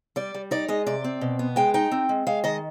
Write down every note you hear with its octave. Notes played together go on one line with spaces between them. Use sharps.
G3 D5
G3
D#4 D5
G#3 D#5
C3 D5
C4
B2
B3
G#3 G5
D#4 G5
C4
G#3
G#3 F5
D#3 D#5